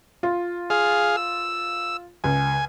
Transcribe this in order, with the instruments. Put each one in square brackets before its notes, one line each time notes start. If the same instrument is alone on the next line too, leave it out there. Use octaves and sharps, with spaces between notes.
[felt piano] F4
[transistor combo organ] G#4 F5
E6
[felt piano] C#2 [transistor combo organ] G#5